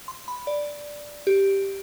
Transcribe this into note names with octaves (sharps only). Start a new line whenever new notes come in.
C6
B5
D5
G4